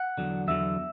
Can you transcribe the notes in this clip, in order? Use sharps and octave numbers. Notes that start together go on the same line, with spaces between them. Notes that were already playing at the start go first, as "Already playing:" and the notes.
Already playing: F#5
E2 D3 F#3
E2 D3 F#3 E5